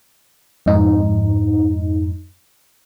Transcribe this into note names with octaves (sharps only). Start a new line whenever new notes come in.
F2 G#2 D#4